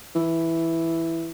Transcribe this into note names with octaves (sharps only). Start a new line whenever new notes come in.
E3